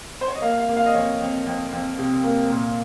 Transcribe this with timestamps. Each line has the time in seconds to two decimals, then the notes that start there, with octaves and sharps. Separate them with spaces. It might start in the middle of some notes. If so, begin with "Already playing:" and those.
0.21 C5
0.28 C#5
0.35 D#5
0.42 A#3 F5
0.60 F5
0.69 A#3
0.77 F5
0.86 D#5
0.94 F2 C#5
1.21 F2
1.47 F2
1.73 F2
1.98 C3
2.24 A#3
2.50 A#2